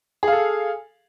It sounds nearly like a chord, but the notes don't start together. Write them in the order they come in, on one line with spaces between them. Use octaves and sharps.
G#4 F5 A4